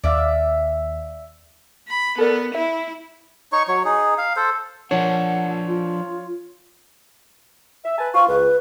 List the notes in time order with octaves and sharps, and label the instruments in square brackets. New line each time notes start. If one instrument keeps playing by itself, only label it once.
[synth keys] D#2 [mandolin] D5 E5 F5
[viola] B5
[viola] B3 [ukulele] A4 A#4 D5
[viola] E4 [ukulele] E5
[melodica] D#4 C#5 C#6
F#3 C#5
D#4 G#4
F5
A4 C5
[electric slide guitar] F3 D4 [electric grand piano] C#5 [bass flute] F#5
[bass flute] F4
[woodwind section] E5
B4 G#5 A5
[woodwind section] F4 [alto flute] C#6
[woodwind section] C#2 [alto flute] B4